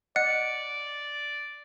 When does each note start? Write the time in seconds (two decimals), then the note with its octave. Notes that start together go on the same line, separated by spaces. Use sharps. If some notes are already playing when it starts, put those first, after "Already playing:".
0.16 D5 D#5 F#5 F#6 C#7